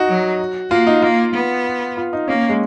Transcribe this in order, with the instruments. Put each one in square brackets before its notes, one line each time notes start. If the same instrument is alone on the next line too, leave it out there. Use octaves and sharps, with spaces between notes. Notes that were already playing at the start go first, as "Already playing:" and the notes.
Already playing: [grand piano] D#4 F#4
[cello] F#3
[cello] A#3 [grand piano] F4
[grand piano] D#4
[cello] A#3 [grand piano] F4
[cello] B3
[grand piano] F4
D#4
[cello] A#3 [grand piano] C#4
[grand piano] G#3